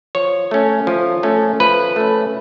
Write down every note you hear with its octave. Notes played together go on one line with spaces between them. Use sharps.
F3 C#5
A3 C#4
F3
A3 C#4
F3 B4
A3 C#4